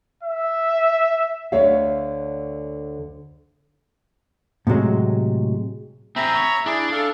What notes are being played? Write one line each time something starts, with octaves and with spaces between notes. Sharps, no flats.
E5
D2 D3 C#5 E5 F5
A2 C3 F#3 G#3
C4 G#4 E5 A#5 B5
C#5
D4 E4 G#4 D6
A4 F5